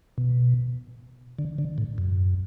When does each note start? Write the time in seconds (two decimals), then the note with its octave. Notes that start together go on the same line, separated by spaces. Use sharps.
0.18 B2
1.39 D3
1.58 D3
1.78 A2
1.98 F#2